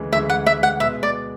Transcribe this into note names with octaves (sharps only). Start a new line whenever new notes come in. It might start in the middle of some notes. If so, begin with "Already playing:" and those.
Already playing: D2 C#3 E3 G#3
D2 C#3 E3 G#3 E5
F#5
E5
F#5
B2 G#3 B3 E5
D5